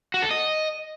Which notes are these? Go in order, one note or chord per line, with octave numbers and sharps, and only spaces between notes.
F#4
A4
D#5